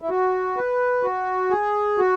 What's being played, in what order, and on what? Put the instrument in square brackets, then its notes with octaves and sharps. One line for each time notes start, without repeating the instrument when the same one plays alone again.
[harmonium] E4
F#4
B4
F#4
G#4
F#4